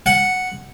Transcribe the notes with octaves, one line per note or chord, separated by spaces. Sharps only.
F#5